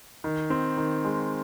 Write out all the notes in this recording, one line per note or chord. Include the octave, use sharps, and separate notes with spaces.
D#3
C4
D#3
G#3